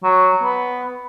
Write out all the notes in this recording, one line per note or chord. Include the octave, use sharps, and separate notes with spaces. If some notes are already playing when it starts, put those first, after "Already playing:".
F#3
B3